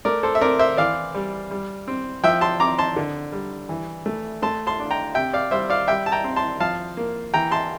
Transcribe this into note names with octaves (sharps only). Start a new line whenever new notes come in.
A3 A#4 D5
A4 C5
E5
C4 A#4 D5
C5 E5
E3 D5 F5
G3
G3
C4
F3 E5 G5
A5 C6
C4 A#5 D6
A5 C6
D3
G3
E3
A3
A3 A5 C6
A5 C6
D4
G5 A#5
C3 E5 G5
D5 F5
G3 C5 E5
D5 F5
G3 E5 G5
A5
G5 A#5
C4
A5 C6
F3 F5 A5
A#3
E3 G5 A#5
A5 C6